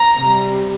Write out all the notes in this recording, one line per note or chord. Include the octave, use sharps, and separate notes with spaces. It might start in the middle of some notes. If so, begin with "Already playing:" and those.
Already playing: A#5
C3
G3